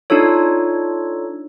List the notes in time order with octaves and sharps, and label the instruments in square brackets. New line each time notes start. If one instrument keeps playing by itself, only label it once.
[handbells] D4 D#4 F4 A4 C#5